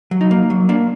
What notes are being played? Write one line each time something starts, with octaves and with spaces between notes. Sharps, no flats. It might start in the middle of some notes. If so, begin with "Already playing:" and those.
F#3
D#4
A#3
F#3
A#3 D4